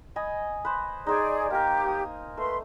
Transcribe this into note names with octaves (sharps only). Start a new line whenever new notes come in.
D#5 G#5 B5
B4 C5
D#4 G#4 C5 D5 G#5
A#3 G4 A#4
D#6
A3 B4 C6